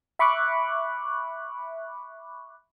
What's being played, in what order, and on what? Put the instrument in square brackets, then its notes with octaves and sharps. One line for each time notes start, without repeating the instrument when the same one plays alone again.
[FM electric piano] E5 B5 C#6 D6 F#6